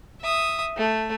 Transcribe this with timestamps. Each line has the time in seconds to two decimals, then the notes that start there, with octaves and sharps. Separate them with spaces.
0.21 E5 D#6
0.77 A3